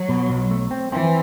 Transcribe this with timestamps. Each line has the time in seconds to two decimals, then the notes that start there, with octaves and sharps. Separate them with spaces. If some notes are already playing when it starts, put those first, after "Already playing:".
Already playing: F#3
0.09 B2
0.30 B1
0.51 A3
0.71 C4
0.92 E3 C4